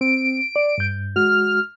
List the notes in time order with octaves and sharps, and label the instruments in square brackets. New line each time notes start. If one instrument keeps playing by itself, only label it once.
[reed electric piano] C4 [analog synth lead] D7
[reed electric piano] D5
G2 G6
[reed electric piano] G#3 F#4 [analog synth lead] F6